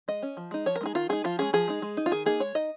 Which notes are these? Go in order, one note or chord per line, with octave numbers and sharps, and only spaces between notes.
G#3 D#5
C#4
F3
G#3 D#4
F3 C#5
A#4
G#3 D#4 G#4
D#3 F4
G#3 D#4 G#4
F3 F4
G#3 C#4 G#4
F3 G#4
G#3 D#4
G#3
D#4
F4
D#3 G#4
A#3 D#4 G#4
G#3 C#5
D#4 D#5